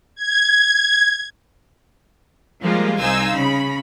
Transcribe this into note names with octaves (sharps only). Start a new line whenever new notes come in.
G#6
F3 G3 G#3 A#3 F4
C2 D#4 C5 F5 G#5 E6
C#3 B5